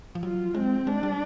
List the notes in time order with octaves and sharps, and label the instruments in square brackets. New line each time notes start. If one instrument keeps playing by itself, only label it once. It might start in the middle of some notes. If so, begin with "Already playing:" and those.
[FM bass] F3
[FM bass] F#3 [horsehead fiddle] F4
[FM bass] G#3 [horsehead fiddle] C4
[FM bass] G#3 [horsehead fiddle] D4
[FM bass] G3